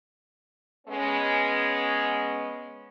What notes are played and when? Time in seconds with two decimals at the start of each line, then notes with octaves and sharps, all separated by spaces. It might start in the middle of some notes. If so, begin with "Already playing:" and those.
0.88 G#3 B3 C#4